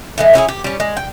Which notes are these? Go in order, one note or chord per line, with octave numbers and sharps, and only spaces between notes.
A2 E3 G#3
C#4 E4 G4 G#4
G4
G3 C#4
G#3
G5